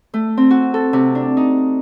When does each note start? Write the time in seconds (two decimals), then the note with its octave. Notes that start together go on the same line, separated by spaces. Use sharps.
0.14 A3
0.37 C4
0.50 F#4
0.74 A4
0.93 C3
1.15 D4
1.37 D#4